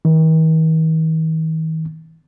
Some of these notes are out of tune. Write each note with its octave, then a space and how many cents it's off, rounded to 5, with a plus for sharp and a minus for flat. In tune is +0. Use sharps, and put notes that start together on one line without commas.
D#3 +45